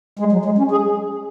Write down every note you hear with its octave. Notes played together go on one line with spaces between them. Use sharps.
G#3
F#3
G#3
C#4
G#4